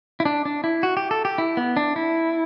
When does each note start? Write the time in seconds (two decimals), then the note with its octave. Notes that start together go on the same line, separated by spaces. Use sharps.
0.20 E4
0.25 D4
0.45 D4
0.64 E4
0.83 F#4
0.97 G4
1.11 A4
1.25 G4
1.38 E4
1.57 B3
1.77 D4
1.96 E4